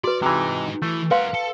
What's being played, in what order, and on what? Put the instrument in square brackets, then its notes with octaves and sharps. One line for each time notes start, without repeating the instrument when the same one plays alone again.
[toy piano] F#4 B4 [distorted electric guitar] D5
[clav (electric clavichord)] C3 E3 [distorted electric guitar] G#3 D#4
[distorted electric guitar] E3 [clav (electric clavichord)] A3
[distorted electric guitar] A#4 F#5 [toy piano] B4 F5 C6
[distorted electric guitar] A4